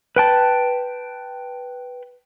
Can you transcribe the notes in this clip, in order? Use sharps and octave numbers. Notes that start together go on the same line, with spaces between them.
B4 G5 A5